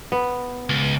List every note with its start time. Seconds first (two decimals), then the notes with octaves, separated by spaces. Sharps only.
0.12 B3
0.69 C#2